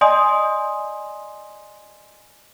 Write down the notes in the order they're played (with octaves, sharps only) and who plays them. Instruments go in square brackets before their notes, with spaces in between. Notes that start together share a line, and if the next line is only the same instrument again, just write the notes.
[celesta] D5 D#5 G#5 C6 D#6